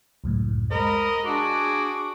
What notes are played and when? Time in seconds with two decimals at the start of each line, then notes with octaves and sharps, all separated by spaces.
0.24 C#2 F#2 A2
0.71 G#3 A#4 C5 D#5 B5
1.25 D4 F#4 G#4 C6 D6